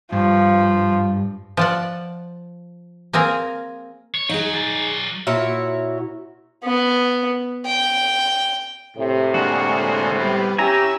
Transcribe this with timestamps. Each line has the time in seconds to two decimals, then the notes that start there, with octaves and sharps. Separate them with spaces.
0.12 G2 F3
1.57 F3 D5 F#5
3.13 A#3 C4 G#4 A#4
4.15 C#5
4.29 F#3 D#4 G#4
4.54 F#3 D5
5.27 A#2 E4 F#4 C#5
6.64 B3
7.66 G5
8.97 A2 C3
9.34 D3 G#3 A#3 F#4
10.20 G3 B3
10.58 C#4 E4 G4 G#5 A#5 E6